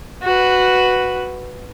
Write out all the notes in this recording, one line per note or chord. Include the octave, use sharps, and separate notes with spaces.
F#4 B4